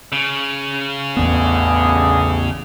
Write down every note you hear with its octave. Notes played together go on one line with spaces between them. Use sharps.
C#3
A1 E2 D3 E3 B3 G#4